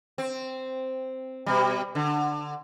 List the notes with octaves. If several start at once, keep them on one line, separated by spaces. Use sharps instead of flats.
C4
B2 G3
D3